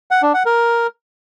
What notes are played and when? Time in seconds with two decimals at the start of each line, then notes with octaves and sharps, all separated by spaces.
0.11 F#5
0.23 D4
0.34 F#5
0.46 A#4